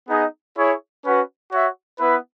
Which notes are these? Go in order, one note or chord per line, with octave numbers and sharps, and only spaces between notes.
B3 D#4 G#4 D#5
E4 G#4 C#5
C#4 F#4 B4 F#5
F#4 C#5 E5
B3 E4 B4